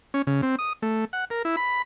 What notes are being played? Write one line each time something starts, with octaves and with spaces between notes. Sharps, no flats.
C#4
C#3
C4
D#6
A3
F#5
A#4
E4
B5